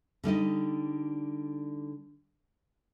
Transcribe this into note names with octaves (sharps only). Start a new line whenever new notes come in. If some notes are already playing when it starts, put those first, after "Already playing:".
D3 G3 D#4 D#5